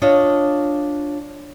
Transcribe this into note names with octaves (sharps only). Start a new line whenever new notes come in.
D4 F4 C#5 D#5